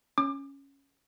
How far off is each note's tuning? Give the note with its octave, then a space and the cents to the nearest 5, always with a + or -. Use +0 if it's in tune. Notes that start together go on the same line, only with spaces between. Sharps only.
C#4 +0 D6 +30